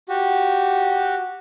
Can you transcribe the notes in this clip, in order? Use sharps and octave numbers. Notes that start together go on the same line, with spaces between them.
F#4 G4